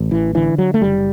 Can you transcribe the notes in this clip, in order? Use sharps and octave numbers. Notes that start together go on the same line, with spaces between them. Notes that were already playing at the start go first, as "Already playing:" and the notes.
Already playing: A1
E3
D3 E3
F#3
A3
F#1 G3